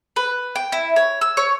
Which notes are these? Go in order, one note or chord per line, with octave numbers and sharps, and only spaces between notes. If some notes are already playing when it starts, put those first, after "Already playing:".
B4
G5
E4
C#5
E6
C#5